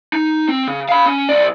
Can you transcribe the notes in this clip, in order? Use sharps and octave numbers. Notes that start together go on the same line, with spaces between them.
D#4
C4
C#3
F5 B5
C#4
C2 D5